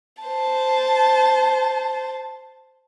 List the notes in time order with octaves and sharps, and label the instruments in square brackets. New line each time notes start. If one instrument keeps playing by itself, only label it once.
[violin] C5 A5